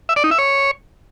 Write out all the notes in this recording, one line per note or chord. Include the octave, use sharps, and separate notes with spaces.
E5
D5
D#4
E5
C#5